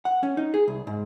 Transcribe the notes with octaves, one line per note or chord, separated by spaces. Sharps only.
F#5
C#4
D#4
G#4
C2
G#2